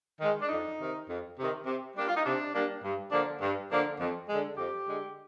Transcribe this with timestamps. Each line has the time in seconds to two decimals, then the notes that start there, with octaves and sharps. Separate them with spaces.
0.20 D#3 G#3
0.41 D4
0.49 F2 D#4
0.79 C3 D#3
1.08 F2
1.38 C3 D#3
1.66 C3
1.95 G3 A#3 D4 G4
2.08 F4
2.16 D#4
2.24 C3 D4
2.54 G3 A#3 D4
2.84 G2
3.12 D3 F3 A#3 D4
3.41 G2
3.71 D3 F3 A#3 D4
4.00 F2
4.28 D3 G#3
4.58 F2 G4
4.88 D3 G#3